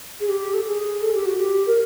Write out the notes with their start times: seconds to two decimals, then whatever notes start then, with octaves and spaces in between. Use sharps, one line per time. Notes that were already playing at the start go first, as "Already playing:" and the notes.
0.20 G#4
0.29 G4
0.54 A4
0.65 G#4
1.01 A4
1.14 G4
1.25 F#4
1.38 G4
1.67 A#4